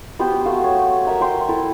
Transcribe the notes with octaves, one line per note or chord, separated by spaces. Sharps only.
B3 F#4 G4 C5
A3 F#4 F5
C#5
A#4 E5 A#5
E5 G5 C6
E4 A4